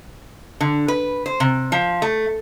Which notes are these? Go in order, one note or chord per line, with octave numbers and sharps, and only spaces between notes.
D3
B4
C5
C3
F3
A3